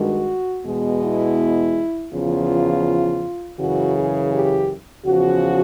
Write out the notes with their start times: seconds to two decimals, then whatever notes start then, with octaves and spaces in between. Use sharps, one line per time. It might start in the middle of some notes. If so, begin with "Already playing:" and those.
Already playing: G2 D#3 G#3 F#4
0.65 E2 B2 G#3
1.03 E4
2.12 E2 C#3 F3 F4
3.58 F#2 C#3 E3 F#4
3.95 G#4
4.32 G4
5.05 E2 C#3 F3 F#4